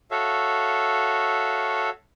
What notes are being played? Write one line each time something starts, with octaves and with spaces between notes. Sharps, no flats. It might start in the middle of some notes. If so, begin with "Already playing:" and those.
F#4 A4 C#5 E5 F5